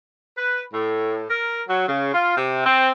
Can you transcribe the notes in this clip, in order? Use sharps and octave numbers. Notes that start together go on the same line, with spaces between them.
B4
A2
A#4
F#3
C#3
F4
C3
C4